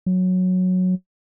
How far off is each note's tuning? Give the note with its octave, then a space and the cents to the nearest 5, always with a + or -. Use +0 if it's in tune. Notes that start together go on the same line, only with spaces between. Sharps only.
F#3 -10